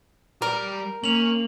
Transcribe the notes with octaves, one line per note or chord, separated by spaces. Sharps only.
G3 A#4 D5
A#3 C#4 F7 F#7